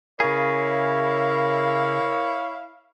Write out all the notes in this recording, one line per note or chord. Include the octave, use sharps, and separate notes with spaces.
C#3 E4 G#4 A#4 C#5 F5